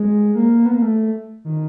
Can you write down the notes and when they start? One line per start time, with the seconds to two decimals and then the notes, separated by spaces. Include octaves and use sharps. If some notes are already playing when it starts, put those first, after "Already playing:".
Already playing: G#3
0.35 A#3
0.66 B3
0.74 A#3
0.82 A3
1.45 D#3